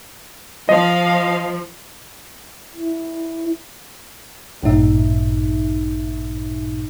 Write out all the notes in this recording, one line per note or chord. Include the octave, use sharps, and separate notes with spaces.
F3 D#5 F5
E4
A1 G2 A#2 D#4 E5